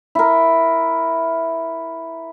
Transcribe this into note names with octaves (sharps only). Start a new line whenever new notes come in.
E4 A#4